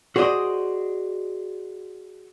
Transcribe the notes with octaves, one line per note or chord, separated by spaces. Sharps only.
F#4 G#4 C5 D5 D#5